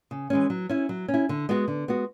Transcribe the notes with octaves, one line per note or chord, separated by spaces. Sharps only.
C#3
E3 G#3 C#4
F#3
C#4 E4
F#3
C#4
E4
D3
G#3 B3 F#4
D3
G#3 B3 F#4